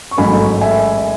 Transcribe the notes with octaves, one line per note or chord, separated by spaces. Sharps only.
C#6
A1 G#2 F#3 A3 G#5 B5
E5 G#5